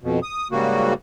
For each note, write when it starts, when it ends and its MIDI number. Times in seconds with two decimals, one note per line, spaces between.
0.03 0.20 41
0.03 0.20 47
0.23 0.48 87
0.51 0.94 44
0.51 0.94 49
0.51 0.94 55
0.51 0.94 58
0.51 0.94 66